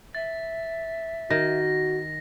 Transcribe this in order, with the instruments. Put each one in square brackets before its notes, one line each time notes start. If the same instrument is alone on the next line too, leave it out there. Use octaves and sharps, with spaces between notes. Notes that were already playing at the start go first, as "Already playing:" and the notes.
[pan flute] E5 [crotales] A6
[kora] D#3 [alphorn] F#4 [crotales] A#6